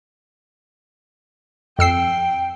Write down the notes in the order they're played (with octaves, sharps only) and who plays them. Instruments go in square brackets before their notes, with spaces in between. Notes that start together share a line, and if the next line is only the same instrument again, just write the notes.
[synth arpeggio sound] F2 E6 C7 [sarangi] G5